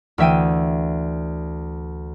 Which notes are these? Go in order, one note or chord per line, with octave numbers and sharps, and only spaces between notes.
D2 E3 E5 G5 D#7